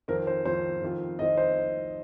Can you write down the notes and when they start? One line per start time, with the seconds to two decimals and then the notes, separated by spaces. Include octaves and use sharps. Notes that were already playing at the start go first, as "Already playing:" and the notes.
0.08 F2 D#3 C4 F4 A#4
0.27 C5
0.45 F2 D#3 C4 F4 C5
0.82 F2 D#3 C4 F4
1.19 F2 D#3 C4 F4 D#5
1.38 C5